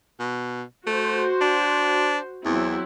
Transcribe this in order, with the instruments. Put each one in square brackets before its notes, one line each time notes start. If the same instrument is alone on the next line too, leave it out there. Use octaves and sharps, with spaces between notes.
[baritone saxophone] B2
[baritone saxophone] A3 [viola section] F#4 C5
[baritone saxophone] D4
[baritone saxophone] E2 [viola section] F#3 C4 E4